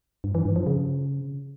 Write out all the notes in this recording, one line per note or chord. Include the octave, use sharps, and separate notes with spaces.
G2
E3
G2
F3
C#3